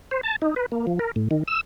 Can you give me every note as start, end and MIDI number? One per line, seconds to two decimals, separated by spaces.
0.11 0.21 72
0.23 0.36 81
0.42 0.54 63
0.56 0.66 71
0.72 0.86 58
0.87 0.99 53
0.99 1.11 70
1.16 1.28 45
1.31 1.43 51
1.47 1.61 88